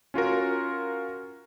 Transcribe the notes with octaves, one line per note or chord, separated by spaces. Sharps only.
C#4 F4 F#4 A#4